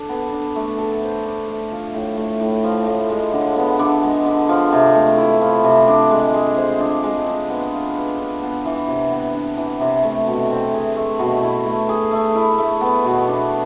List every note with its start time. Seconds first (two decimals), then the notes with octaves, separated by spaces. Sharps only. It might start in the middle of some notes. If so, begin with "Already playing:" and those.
Already playing: D4 A4
0.09 B3
0.32 D4
0.56 A3
0.78 A4
1.02 C5
1.26 D4
1.48 A3
1.71 F3
1.94 A2
2.17 A3
2.40 A2
2.64 F3
2.87 A2
3.10 G#3
3.33 D3
3.56 B3
3.79 D3
4.03 G#3
4.26 D3
4.49 F3
4.72 C3
4.94 A3
5.18 E4
5.41 F3
5.64 C3
5.88 D4
6.11 G#3
6.34 G#4
6.57 C5
6.80 D4
7.04 G#3
7.27 D4
7.49 B3
7.73 F4
7.96 B4
8.19 D4
8.42 B3
8.65 E3
8.88 C3
9.11 B3
9.34 D4
9.57 E3
9.81 C3
10.03 A3
10.27 B2
10.50 C4
10.73 G#4
10.97 A3
11.19 B2
11.43 E4
11.66 A3
11.89 G#4
12.12 A3
12.35 E4
12.58 A3
12.81 B3
13.05 B2
13.28 D4